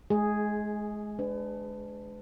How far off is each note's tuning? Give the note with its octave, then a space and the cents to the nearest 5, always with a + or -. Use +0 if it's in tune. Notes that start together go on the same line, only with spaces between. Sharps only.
G#3 +25 G#4 +0
D4 +0 B4 +35